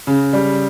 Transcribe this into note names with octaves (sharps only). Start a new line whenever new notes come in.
C#3
G3